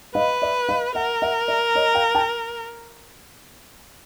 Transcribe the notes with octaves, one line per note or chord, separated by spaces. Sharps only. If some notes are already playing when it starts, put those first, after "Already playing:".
B4 D#5 F5
D5 E5
D#5 F5
A#4 E5 F#5
E5 F#5
D5 E5
C#5 D#5
F5 G5
G5 A5